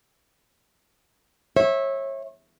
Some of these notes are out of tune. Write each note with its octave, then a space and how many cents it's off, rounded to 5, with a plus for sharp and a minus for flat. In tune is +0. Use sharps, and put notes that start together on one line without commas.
C#5 -30 E5 -10